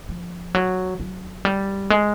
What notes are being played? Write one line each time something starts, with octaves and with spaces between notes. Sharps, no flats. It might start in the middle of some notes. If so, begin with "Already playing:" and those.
F3
F#3
F#3
G3
G#3